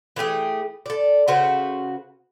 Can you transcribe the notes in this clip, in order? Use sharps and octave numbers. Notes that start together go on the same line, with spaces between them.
E3 A3 G4 G#4
A4 D5
C#3 F#4 B4 C5